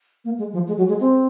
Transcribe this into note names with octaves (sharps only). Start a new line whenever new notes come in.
A#3
G#3
F3
G#3
F#3
G#3
C4